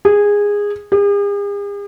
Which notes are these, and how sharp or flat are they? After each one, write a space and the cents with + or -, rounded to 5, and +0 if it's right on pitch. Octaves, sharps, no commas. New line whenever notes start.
G#4 -15
G#4 -45